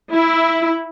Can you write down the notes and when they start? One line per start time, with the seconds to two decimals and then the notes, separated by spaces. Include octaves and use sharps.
0.13 E4